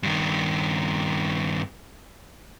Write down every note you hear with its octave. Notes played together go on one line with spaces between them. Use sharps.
G2 D#3